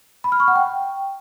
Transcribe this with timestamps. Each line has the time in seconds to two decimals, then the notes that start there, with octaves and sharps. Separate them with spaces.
0.24 B5
0.32 F6
0.40 C#6
0.48 F#5
0.56 G5